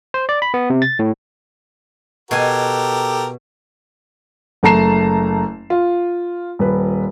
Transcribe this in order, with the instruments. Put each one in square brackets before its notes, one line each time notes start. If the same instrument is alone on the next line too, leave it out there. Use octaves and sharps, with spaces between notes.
[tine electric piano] C5
D5
B5
B3
C3
A6
A2
[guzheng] B2 G#5 [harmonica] G4 A4 A#4
[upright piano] F#1 A3 A5 A#5 C7 E7
F4
D#1 B4